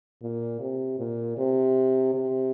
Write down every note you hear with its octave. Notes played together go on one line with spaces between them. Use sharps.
A#2
C3
A#2
C3
C3